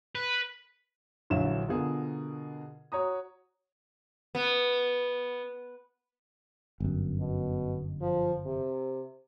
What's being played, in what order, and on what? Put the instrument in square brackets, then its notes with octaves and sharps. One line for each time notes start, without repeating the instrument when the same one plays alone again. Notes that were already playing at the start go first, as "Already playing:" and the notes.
[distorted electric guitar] B4
[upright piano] A#1 D3 E3 F#3 E5 E7
B2 D3 F4 G#4 A#4
F#4 C#5 A#5 D#6
[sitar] B3
[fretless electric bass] G1 F#2
[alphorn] B2
F3
C3